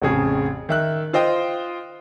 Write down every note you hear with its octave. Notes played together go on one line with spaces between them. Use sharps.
A1 F2 C#3 G#4
D#3 E5 F#6
F4 C5 D#5 G5 D#6